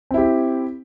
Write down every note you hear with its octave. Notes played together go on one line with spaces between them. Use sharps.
C4 E4 G4